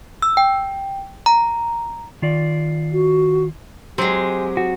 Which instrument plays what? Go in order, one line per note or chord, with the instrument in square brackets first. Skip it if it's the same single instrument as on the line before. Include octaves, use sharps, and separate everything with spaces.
[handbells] E6
G5
A#5
[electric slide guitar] D#3 F4 D5
[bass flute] F#4
[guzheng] F#3 G#3 [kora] C4 [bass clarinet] G4
[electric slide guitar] F#4